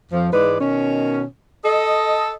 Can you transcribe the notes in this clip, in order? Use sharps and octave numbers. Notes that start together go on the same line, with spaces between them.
F2 F3
G#2 E3 G#3 B4 D5
B2 D#3 C#4
A4 D#5